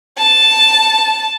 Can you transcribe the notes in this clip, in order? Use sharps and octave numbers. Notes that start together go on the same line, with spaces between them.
A5